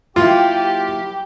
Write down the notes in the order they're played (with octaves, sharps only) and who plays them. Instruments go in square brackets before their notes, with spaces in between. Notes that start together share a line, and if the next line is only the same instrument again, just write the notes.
[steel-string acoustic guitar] F#3 A#3 E4 [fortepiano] F4 [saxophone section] G4